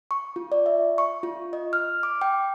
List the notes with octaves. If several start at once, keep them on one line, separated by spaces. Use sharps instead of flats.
C#6
F4
D5
E5
C#6
F4
D#5
F6
D6
G5